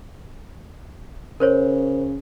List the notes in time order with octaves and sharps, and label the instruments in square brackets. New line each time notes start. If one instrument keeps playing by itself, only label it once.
[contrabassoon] C#3 [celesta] A#4 C5 C#5